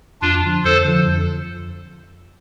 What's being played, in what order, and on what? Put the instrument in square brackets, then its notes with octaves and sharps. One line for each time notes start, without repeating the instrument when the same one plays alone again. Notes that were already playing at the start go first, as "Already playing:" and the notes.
[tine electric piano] F2 [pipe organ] D4 F4
[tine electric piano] D3 F3
[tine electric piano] F2 [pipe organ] A4 C5
[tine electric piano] D3 F3
F2